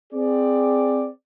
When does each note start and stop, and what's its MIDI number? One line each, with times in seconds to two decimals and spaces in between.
0.13 1.08 60
0.13 1.08 68
0.13 1.08 74